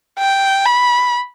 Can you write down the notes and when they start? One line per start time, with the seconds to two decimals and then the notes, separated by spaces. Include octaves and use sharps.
0.19 G5
0.66 B5